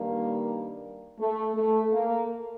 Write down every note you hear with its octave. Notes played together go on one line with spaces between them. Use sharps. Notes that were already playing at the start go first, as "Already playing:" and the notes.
Already playing: G2 D#3 G3 A#3
A3
A3
A#3